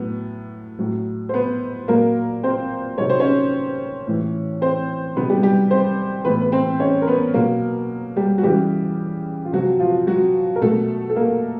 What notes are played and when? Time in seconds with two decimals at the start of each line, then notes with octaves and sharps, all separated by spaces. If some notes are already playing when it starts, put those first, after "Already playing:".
Already playing: A2 F#3 B3
0.79 A2 F#3
1.29 C5
1.34 B3 B4
1.88 A#2 F#3 A#3 A#4
2.43 C4 C5
2.98 C3 D#3 F#3 C#5
3.10 C5
3.20 C#4 C#5
4.07 A2 E3
4.61 C4 C5
5.16 C3 D#3 F#3 B3 B4
5.30 G3 G4
5.43 G3 G4
5.71 C4 C5
6.25 A2 E3 B3 B4
6.41 B4
6.52 C4 C5
6.80 C#4 C#5
7.02 A#4
7.07 B3 B4
7.34 B2 F#3 A#3 A#4
8.16 G3 G4
8.38 F#4
8.43 C#3 E3 G3 G4
9.45 F4
9.52 C3 F3 F#3 F#4
9.80 F3 F4
10.07 F#3 F#4
10.56 A#4
10.62 B2 F#3 A3 A4
11.10 A4
11.16 A#3 A#4